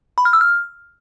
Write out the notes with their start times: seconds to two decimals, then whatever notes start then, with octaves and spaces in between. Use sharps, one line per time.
0.18 B5
0.25 F6
0.33 E6
0.41 F6